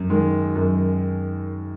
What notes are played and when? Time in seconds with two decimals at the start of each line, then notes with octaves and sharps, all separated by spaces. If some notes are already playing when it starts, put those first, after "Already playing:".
Already playing: F#2
0.10 D#3 G#3
0.55 F#2